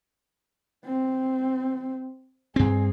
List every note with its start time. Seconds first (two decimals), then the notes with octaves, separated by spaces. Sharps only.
0.85 C4
2.56 G2 C4 G#4